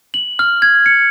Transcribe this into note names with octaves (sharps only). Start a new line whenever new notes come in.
F#7
F6
G#6
C#7